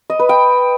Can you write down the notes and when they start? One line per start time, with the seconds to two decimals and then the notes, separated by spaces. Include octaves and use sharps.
0.10 D#5
0.19 B4
0.29 G5